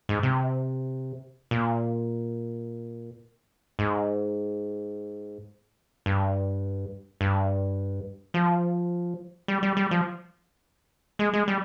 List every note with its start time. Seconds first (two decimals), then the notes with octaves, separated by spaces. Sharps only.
0.09 G#2
0.23 C3
1.51 A#2
3.79 G#2
6.06 G2
7.21 G2
8.34 F3
9.48 G3
9.63 G3
9.77 G3
9.91 F3
11.19 G#3
11.33 G#3
11.48 G3